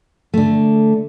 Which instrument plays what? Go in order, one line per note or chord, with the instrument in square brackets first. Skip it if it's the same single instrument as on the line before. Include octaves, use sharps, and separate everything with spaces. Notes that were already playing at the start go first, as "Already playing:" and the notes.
[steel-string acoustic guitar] D3 A3